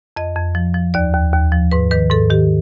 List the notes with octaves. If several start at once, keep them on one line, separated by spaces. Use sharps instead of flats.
F2 D#5
F2
F3
F3
D#2 D5
D#2
D#2
F3
G#2 B4
D#3 B4
G#2 A4
D#3 G4